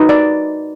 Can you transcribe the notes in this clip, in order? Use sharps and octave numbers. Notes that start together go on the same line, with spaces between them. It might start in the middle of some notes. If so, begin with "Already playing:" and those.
Already playing: D#4 F#4 B4
D5